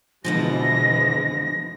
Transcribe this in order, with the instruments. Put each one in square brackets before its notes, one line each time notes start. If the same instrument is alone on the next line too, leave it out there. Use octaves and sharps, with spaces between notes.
[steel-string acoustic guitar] F2 D3 F3 [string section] B2 E3 G#3 [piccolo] A#6